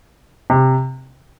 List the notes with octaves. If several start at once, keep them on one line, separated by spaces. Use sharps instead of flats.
C3